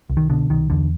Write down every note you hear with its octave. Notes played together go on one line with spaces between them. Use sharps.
C2
D#3
B2 D3
C2 D#3
E2 D3